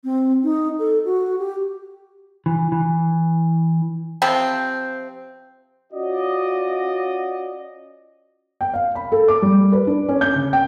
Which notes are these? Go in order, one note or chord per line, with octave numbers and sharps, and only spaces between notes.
C4
D#4
A4
F#4
G4
E3
E3
C3 F3 C4
C#4 F4 F#4 D5 D#5
G5
F5
B5
A4
D6
G3
B4
D4
C#4
G6
C#3
G5